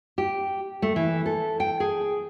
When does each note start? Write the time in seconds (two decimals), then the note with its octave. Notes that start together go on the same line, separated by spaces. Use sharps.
0.18 G4
0.82 A3
0.96 E3
1.26 A4
1.60 G5
1.80 G#4